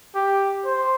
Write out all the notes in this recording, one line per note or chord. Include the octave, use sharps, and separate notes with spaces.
G4
C5